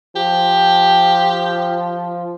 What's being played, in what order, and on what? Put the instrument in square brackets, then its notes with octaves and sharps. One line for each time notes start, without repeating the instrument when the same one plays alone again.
[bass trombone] F3 [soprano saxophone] G4